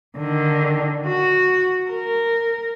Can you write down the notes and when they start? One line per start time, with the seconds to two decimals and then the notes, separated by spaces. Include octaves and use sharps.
0.18 D3 D#3
1.07 F#4
1.89 A#4